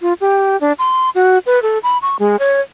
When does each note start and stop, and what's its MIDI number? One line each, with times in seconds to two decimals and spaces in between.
0.01 0.13 65
0.21 0.59 67
0.61 0.73 62
0.79 1.10 84
1.15 1.38 66
1.46 1.62 71
1.62 1.78 69
1.83 1.98 83
2.02 2.17 85
2.19 2.39 56
2.39 2.61 73